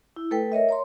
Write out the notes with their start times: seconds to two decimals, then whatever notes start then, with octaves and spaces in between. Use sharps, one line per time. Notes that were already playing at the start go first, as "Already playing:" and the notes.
0.16 E4
0.31 A3 A4 B4 G5
0.52 A#4 C#5 D#5 E5
0.69 C#5 A#5 C6